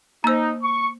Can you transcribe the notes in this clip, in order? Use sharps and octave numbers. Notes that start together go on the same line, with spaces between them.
A#3 D#4 C5 A#5 E6
C#6